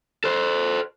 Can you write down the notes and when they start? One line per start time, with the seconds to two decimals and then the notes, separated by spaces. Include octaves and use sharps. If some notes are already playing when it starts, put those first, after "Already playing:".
0.24 A4 C5